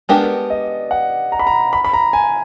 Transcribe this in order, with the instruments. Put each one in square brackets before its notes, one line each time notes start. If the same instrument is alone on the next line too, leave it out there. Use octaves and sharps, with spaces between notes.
[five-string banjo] G#3 B3 D4 G4 A#4 [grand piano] D5
[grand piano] D#5
F#5
A#5
B5
A#5
B5
B5
A#5
G#5